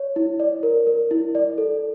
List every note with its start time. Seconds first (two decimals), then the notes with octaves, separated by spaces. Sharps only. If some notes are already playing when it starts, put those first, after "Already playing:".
Already playing: C#5
0.16 E4
0.40 D5
0.63 A#4
0.87 A#4
1.11 E4
1.35 D5
1.58 A4